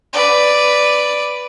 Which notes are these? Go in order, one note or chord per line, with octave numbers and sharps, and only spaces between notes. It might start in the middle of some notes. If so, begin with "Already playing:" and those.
B4 D5